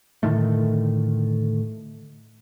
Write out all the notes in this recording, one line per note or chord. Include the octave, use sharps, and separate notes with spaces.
A2 D3 D#3 A3